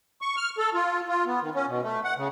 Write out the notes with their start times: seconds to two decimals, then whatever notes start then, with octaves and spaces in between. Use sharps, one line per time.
0.21 C#6
0.36 F6
0.58 A4
0.74 F4
1.08 F4
1.26 B3
1.42 D#3
1.55 C#4
1.67 B2
1.82 A3
2.04 F#5
2.17 C#3